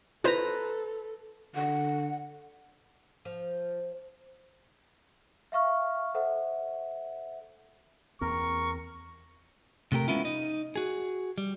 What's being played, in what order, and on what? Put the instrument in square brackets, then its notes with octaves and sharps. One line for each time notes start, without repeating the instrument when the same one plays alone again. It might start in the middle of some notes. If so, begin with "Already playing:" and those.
[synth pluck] E4 F4 C5 [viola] A4 [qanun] B4 A#5
[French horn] D3 [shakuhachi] F#5
[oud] F3
[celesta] E5 F5 C#6 F6
A4 C5 E5 F#5
[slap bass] E2 A#3 C4 [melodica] A#4 [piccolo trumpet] C#6
[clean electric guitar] C3 A3 G4 A#4
G#3 B3 C#4 E4 F4
D#4 D#5
F#4 G#4
G3